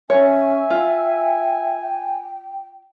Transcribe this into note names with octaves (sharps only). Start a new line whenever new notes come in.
C#4 C#5 E5 G#5
F4 G5